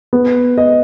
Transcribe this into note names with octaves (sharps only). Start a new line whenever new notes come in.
B3
D#5